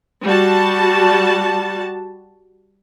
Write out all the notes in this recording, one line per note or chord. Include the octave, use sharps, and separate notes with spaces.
G3 F#4 A5